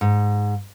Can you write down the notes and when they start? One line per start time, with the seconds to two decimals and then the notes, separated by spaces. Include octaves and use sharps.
0.01 G#2